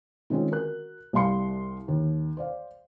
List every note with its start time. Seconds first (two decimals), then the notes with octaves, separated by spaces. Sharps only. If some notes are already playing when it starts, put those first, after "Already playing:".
0.30 D#3 G#3 C4 C#4 F4 G#4
0.51 F#4 A#4 F#6
1.13 C2 G3 F5 C6 C#7
1.88 D#2
2.37 C5 D5 F5